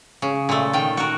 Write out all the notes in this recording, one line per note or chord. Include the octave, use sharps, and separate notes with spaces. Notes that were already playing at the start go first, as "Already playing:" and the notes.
C#3
A#2 A3
D#3 G5
F#4 A#4